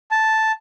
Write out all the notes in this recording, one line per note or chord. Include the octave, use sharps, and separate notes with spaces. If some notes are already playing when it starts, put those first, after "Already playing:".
A5